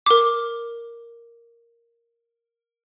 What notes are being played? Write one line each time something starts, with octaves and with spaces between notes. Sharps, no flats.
A#4 D6